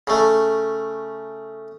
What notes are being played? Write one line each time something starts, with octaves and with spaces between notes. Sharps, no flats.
C#3 A3